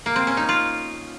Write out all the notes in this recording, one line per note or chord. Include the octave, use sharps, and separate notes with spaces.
A#3
C4
C#4
D#4
F4